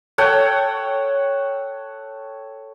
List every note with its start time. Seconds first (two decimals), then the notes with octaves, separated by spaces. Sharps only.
0.18 A4 C#5 F#5 G5